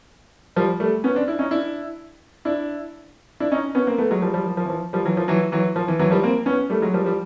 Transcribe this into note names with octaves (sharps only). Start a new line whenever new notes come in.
F3 G3
G3 A3
B3 C#4
C4 D4
D4 E4
C#4 D#4
D4 E4
D4 E4
D4 E4
C#4 D#4
B3 C#4
A#3 C4
A3 B3
F#3 G#3
F3 G3
F3 G3
F3
F3
E3
F3
F3 G3
E3 F#3
F3
E3 F#3
E3 F#3
F3
E3
E3 F#3
F3 G3
A#3 C4
B3 C#4
G3 A3
F#3 G#3
F3 G3
F3 G3